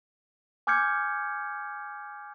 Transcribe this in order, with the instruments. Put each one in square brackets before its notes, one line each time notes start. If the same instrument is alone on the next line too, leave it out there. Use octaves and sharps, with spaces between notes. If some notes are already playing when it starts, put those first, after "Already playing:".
[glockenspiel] G#5 D6 F6 G6 G#6 C#7